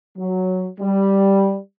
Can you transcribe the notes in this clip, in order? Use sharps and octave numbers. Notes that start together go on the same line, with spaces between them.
F#3
G3